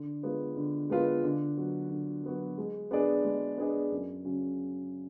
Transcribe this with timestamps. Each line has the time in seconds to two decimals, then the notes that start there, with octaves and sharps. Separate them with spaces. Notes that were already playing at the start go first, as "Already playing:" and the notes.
Already playing: D3
0.23 G#3 B3 F4 B4
0.56 D3
0.90 G#3 B3 F4 B4
1.24 D3
1.57 F#3 B3 F#4
1.90 D3
2.23 F#3 B3 F#4
2.58 G#3
2.91 B3 D4 G#4 D5
3.25 G#3
3.58 B3 D4 G#4 D5
3.92 F#2
4.25 C#3 F#3 C#4